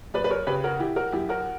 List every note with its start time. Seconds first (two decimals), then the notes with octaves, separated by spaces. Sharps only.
0.14 F#2 B4 D5
0.24 B4
0.30 A#4 C#5
0.47 C#3 G4 B4
0.64 F#4 A#4
0.79 E3 E4 G4
0.96 F#4 A#4
1.12 F#2 E4 G4
1.29 F#4 A#4